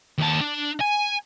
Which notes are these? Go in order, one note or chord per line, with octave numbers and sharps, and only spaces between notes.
D#2 A5
D4
G#5